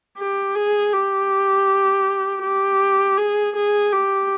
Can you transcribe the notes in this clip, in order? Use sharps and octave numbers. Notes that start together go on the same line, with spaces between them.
G4
G#4
G4
G4
G#4
G#4
G4